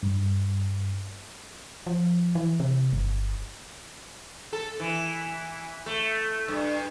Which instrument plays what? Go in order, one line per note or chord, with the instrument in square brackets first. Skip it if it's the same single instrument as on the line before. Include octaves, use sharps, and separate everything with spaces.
[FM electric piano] G2
[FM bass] F3
E3
C3
G1
[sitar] A4
E3
A3
G2